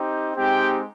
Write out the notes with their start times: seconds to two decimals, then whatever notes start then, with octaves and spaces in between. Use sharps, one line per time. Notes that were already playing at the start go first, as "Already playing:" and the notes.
Already playing: C4 D#4 G4
0.36 G#3 C4 D#4 G4 G5